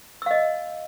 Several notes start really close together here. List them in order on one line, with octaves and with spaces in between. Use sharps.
E6 F5 D#5